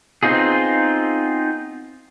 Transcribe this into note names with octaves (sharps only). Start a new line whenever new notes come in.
B3 C4 D#4 F4 G#4